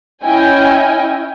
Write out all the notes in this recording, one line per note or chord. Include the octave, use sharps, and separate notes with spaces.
C#4 E4 C#5 D#5 G5 G#5